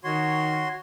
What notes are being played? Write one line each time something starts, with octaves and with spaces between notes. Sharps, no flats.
D#3 F#4 C#5 C6